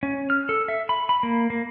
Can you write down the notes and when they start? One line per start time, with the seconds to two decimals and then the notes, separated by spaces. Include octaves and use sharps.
0.03 C#4
0.30 F6
0.49 A4
0.68 E5
0.89 B5
1.09 B5
1.23 A#3
1.50 A#3